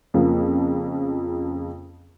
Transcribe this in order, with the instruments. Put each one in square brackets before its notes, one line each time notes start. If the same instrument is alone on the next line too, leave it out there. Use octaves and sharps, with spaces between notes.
[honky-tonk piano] F2 C#3 F3 A#3